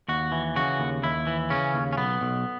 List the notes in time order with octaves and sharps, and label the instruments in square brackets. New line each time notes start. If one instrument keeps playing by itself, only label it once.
[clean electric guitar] D#2 F#4
E3
C#3 F#4
D#2
D#2 E4
E3
C#3 C#4
D#2
C#4
B1 B3
B1